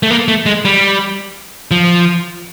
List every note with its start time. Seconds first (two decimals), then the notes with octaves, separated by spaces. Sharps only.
0.03 A3
0.10 A#3
0.28 A3
0.46 G#3
0.65 G3
1.71 F3